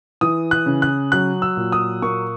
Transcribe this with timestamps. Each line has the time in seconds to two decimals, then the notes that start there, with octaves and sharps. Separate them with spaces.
0.21 E3 D#6
0.51 F#6
0.66 C#3
0.82 F#6
1.12 F#3 F#6
1.42 E6
1.57 A#2
1.72 D#6
2.02 A#3 C#6